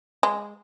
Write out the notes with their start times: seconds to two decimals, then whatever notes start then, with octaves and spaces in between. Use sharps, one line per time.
0.23 G#3